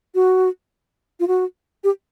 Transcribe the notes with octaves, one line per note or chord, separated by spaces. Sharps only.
F#4
F4
F#4
G4